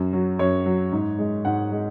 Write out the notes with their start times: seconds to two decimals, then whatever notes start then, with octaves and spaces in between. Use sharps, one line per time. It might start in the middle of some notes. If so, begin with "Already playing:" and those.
Already playing: F#2
0.13 F#3
0.39 F#2 C#5
0.66 F#3
0.92 G#2
1.19 G#3
1.45 G#2 F#5
1.72 G#3